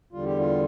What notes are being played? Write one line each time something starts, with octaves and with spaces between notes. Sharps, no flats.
E2 D3 G3 F4
G4
F4